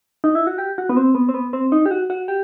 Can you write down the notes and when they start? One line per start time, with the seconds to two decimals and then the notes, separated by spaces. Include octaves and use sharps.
0.24 D#4
0.35 E4
0.47 F#4
0.58 G4
0.78 F#4
0.89 B3
0.97 C4
1.15 B3
1.29 C4
1.34 B3
1.53 C4
1.72 D#4
1.86 G4
1.91 F#4
2.10 F#4
2.28 G4